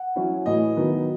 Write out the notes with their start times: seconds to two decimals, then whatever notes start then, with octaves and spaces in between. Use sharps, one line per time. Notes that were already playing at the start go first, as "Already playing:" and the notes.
Already playing: F#5
0.16 F#3 C#4 E4
0.46 A2 E3 A3 E4 D#5
0.77 D#3 F#3 B3 D#4